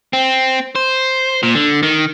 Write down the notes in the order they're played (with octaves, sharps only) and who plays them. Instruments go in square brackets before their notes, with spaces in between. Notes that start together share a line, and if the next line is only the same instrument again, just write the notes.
[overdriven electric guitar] C4
C5
A#2
D3
D#3